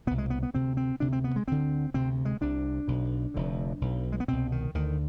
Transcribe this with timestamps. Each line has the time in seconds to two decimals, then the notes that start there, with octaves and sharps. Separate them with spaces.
0.07 C2 B2 B3
0.18 G#3
0.30 B3
0.43 B3
0.54 D2 C3 C4
0.77 C4
1.00 D2 C3 D4
1.13 C4
1.24 B3
1.36 G#3
1.48 D2 D3 C4
1.94 D2 C3 C4
2.25 G#3
2.41 C2 C3 D4
2.88 B1 B2
3.34 F1 F2 D3
3.81 B1 B2
4.12 G#3
4.20 B3
4.28 C2 B2 C4
4.52 D#3
4.75 D2 D3 D#3